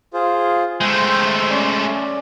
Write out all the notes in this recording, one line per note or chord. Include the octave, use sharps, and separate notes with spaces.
F4 G#4 C5
G#3 A3 C5 E5 G5
C#4 D5